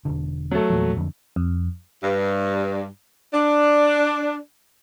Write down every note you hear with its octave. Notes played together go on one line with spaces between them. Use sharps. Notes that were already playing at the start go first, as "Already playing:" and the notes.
E1 B1 D3
F#3 A3
E2 A#2 F3
F2 D3
F2
G2
D4